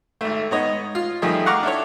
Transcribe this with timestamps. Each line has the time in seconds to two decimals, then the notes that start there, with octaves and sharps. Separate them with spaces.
0.21 G#1 A3
0.51 G#2 B3 C#5 D#5
0.95 F4
1.22 G2 D#3 F3 A3 D#4 G#4
1.46 F5 F#5 A#5 C#6 D6 F6
1.63 D4 E4 A4 C#5